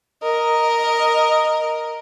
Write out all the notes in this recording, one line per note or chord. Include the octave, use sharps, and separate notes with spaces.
A#4 D#5